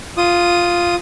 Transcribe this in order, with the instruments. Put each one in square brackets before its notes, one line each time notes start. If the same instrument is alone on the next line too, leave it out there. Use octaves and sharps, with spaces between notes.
[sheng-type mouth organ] F4 D#6